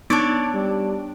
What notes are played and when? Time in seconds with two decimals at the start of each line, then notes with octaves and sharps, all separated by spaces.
0.10 B3 D4 D#4 C#5 D5
0.54 G3